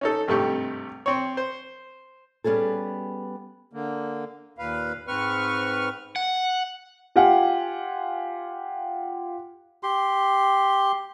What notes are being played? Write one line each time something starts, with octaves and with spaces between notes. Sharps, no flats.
C#4 D#4 A4
G#1 G2 C3 A3 G4 C#6
C4 C#5
C5
G3 B3 C#4 G#4 A4
D3 A#3
D#2 A#2 B4 F5
G#2 C4 B4 C#6 F6
F#5
F4 G4 F5 F#5 G#5
G4 C6